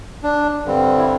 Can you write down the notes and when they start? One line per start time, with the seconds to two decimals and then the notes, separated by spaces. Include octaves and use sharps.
0.23 D4
0.65 G2 D3 G3 C4
0.98 E4